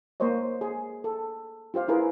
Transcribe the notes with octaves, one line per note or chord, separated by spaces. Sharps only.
A#3 A#4 C5 C#5 D#5
G#4
A4
F4 G4 C5 F5
E4 F4 G#4 A#4 B4